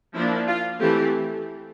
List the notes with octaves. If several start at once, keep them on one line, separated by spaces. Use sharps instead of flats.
F3 A#3 D4 E4
F4
E3 A3 C4 G4